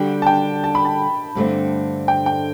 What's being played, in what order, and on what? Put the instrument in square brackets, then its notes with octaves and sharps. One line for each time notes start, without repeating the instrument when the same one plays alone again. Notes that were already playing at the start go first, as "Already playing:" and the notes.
Already playing: [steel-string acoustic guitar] D3 G3 D4 F#4 [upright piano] G5
[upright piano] A5
G5
A5
B5
A5
[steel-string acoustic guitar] G2 D3 A3 C4
[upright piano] G5
G5